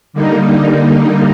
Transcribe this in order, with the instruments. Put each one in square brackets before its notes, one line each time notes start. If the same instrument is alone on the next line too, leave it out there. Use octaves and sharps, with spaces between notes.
[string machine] D3 G3 A#3 D#4